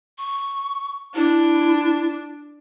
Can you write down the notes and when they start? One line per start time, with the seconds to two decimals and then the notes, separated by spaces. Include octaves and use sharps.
0.18 C#6
1.15 D4 E4